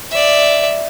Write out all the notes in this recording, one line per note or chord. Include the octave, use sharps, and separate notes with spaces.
D5 E5